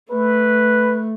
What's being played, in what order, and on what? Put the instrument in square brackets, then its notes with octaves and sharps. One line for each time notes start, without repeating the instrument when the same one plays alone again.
[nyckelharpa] A3 [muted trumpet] B4